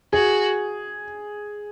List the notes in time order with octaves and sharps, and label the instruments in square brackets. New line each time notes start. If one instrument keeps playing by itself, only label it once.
[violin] F#4 [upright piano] G#4